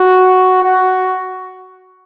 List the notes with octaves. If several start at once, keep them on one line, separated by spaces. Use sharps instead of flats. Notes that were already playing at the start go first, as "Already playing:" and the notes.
Already playing: F#4
F#4